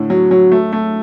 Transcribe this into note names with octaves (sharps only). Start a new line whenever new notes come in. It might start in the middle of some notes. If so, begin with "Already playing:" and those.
Already playing: A2 D3
F#3
F#3
A3
A3